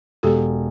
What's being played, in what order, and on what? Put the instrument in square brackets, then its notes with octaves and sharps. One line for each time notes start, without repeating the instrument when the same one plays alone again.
[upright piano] E1 [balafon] G4 A4